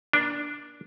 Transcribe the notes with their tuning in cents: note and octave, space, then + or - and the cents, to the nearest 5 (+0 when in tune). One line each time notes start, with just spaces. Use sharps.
A#3 +35 D4 +0